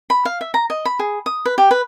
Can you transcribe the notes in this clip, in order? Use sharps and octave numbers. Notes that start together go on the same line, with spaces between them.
B5
F5
E5
A#5
D#5
B5
G#4
D#6
B4
G4
B4